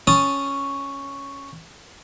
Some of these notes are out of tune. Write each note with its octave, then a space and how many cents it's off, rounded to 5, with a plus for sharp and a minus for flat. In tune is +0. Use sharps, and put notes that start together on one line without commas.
C#4 +0 A5 +0 D#6 +0